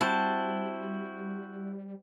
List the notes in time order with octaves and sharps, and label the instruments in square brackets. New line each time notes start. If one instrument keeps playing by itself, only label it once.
[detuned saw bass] G3 [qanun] C4 [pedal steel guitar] E4 F#4 C5 [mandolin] A5